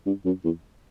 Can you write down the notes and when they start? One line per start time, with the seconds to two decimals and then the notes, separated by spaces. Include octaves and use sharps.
0.06 G2
0.25 F#2
0.44 E2